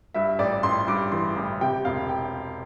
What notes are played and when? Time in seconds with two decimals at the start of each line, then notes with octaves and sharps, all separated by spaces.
0.14 G2 E5
0.39 A1 D5
0.63 A1 C6
0.88 G2 D6
1.12 E3 C6
1.36 A1
1.61 C3 G5
1.85 E1 F5
2.09 G5